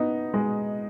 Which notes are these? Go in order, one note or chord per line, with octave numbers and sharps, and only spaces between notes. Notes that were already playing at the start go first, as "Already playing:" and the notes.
Already playing: B3 D#4
G#3